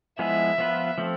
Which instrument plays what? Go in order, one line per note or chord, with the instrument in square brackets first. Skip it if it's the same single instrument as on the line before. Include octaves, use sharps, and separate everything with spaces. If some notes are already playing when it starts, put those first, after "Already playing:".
[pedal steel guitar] F3 G#3 B3 E4 G#4 [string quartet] E5
[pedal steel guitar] F3 B3 F4 B4
F3 A3 C4